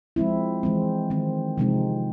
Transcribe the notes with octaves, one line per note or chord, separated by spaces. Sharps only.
F3 G#3 C4 E4
E3 G#3 C4
D#3 G#3 C4
C3 F3 G#3 C4 D#4